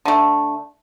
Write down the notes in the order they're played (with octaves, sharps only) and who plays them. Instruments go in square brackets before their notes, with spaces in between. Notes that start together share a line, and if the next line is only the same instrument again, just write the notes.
[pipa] D3 A3